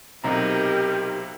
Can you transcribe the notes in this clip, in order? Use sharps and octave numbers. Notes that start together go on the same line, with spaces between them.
B1 C3 D#4 G4 A#4 A#5